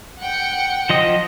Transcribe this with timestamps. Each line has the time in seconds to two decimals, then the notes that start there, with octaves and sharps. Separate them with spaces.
0.20 F#5 G5 C#7
0.90 F3 D#5 D#6